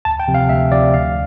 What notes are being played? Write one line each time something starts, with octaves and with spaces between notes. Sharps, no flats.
D2 A5
G5
C3 F3
F5
D2 E5
C3 F3 D5
D2 F5